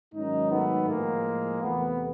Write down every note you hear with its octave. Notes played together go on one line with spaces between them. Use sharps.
G#2 D#3 F#3 C#4 D#4
A3 B3
A2 F3 G#3 A#3
E2 C3 E3 A3 B3